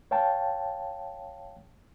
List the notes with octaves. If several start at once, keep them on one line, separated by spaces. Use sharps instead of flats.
C#5 F5 G5 A5